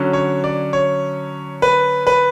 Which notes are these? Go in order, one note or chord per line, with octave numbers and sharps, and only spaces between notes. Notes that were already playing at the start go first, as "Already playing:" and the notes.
Already playing: D3 F#3 C#4
C#5
D5
C#5
B4
B4